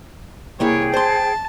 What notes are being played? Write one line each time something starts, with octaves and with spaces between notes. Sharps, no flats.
C2 A#3 E4 G#4 C#5 G5
C5 A5 C6